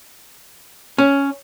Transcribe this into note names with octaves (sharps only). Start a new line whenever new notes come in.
C#4